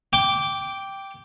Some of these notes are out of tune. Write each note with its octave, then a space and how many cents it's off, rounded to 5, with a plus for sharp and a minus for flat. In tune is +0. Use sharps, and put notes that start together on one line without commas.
G5 +0 D6 -10